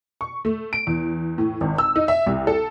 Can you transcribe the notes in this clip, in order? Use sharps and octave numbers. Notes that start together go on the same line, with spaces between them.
C#6
A3
D7
E2
A2
G#1
E6
D#4
E5
C2
A4